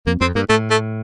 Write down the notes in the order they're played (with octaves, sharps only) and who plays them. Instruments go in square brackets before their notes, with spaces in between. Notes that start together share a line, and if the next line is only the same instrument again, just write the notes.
[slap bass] F2 [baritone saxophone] A#3
[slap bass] F2 [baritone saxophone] C4
[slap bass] G2 [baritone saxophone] A#3
[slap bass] A2 [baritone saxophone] A3
[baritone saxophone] A3